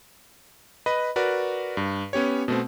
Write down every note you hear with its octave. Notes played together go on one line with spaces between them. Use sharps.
B4 D#5 B5
F#4 A#4 B4 D5
G2
B3 C#4 G4 C#5
B2 A3 C4